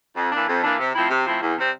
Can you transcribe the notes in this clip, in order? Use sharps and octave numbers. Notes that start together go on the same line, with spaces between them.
F2
E3 A#3 D4
F2
E3 A#3 D4
C3
F3 A3 C4 E4
C3
F3 A3 C4 E4
E2
C3 G3 C4